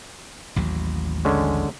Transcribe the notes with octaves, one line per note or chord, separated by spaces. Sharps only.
A1 D#2 F#3
D3 G#3 C#4